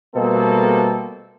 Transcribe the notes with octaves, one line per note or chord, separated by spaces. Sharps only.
B2 G3 A3 A#3 C4 A4